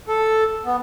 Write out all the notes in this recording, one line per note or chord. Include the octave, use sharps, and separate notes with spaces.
A4
B3